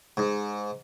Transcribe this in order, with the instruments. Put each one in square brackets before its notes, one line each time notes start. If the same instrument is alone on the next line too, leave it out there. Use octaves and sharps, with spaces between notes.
[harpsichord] G#2